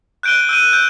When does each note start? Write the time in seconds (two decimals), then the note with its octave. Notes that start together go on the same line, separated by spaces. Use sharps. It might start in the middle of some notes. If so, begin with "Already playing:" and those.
0.23 F#6 G6 D7 D#7 G7
0.49 E6 G6 D#7
0.73 G6